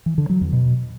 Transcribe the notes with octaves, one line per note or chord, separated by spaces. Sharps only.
E3
D3
F#3
E2
B2